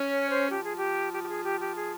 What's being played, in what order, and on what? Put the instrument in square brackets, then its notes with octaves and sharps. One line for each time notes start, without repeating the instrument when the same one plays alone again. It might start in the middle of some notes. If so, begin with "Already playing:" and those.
Already playing: [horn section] C#4
[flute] C#5
C5
[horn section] F3 [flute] G4
[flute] G#4
G4
G4
G4
G#4
G4
G4
G#4